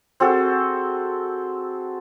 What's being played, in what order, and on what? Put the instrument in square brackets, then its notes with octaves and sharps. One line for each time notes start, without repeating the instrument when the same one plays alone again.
[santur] C4 F#4 G#4 A4